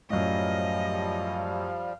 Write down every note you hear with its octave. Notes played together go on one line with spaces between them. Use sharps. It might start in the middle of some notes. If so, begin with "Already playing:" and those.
F#2 A2 F3 G3 D#5 F5